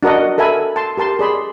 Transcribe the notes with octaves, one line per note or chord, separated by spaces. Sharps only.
D4 F#4 A#4 D#5 F#5
A4 A#4 E5 G#5 B5
A5 C6
G4 A#4 A5 C6
G#4 D5 B5 C6